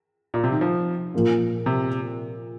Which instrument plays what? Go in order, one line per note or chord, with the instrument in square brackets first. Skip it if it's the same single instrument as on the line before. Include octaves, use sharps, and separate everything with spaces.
[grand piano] A#2
C3
D#3
F3
[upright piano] A#2 F3 A#3 F4
[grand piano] C3